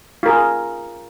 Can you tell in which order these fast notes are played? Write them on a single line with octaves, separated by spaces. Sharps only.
F4 A#4 G#4